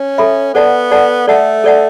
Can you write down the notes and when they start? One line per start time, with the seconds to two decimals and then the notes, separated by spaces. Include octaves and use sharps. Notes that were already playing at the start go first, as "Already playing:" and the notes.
Already playing: C#4
0.18 A4 E5 B5
0.54 B3 A4 D5 F#5 A5
0.91 A4 D5 F#5 A5
1.27 A3 A4 D5 F#5 A5
1.64 A4 D5 F#5 A5